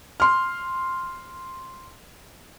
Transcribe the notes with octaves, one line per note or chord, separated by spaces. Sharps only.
C6 F6